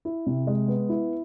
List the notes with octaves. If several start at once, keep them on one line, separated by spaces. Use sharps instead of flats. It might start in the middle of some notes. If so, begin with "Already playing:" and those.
E4
C3
G#3
B3
E4